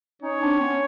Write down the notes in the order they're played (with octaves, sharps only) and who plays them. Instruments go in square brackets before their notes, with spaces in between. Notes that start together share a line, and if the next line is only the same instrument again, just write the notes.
[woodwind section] C#4 D#4 [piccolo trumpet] C#5
[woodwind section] C4 D4
B3 C#4